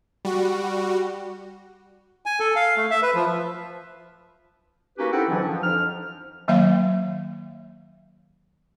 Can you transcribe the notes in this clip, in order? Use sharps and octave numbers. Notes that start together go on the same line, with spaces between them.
G3 F#4
G#5
A4
F5
A3
E5
B4
F3
A#3 C#4 D#4 F#4 G4 B4
C4 D#4 E4 A4 F#5 G5
G#2 D3 E3 F#3 C#4 D4
F3
F2 D4 D#4 F6
D#3 F#3 A#3 C#5 E5 F5